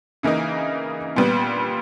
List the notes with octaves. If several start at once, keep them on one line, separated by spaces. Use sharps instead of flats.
C#3 E3 A#3 D#4
A#2 G3 B3